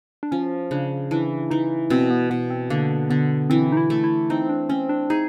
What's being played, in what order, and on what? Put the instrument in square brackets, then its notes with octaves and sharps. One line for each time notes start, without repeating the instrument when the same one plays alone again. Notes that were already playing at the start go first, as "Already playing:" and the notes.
[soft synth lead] D4
[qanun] F3 [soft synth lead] C#4
[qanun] C#3 [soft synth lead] D4
[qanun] E3 [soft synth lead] D4
[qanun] E3 [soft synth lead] D#4
[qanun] B2 [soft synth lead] C4
[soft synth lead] B3
[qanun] B2 [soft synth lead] B3
[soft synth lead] C4
[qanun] D3 [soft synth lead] A#3
[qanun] D3 [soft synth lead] B3
[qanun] E3 [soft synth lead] C4
[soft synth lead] D#4
E4
[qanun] A3
[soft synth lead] E4
[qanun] C4 [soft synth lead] D#4
[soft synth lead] D4
[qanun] C4 [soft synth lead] C#4
[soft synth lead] D4
[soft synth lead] D#4 [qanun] G#4